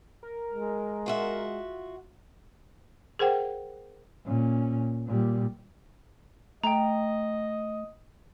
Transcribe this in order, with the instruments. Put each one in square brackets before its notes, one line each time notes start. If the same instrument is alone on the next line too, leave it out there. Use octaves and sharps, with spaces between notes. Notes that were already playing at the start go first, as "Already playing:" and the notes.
[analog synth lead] A#4
[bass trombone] G#3
[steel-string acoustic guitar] F4 F#4 E5
[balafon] G#4 A#4 C5 F#5 G5
[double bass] A#2 C#4
A#2 G3
[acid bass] A3 [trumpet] D#5 [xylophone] G5 A#5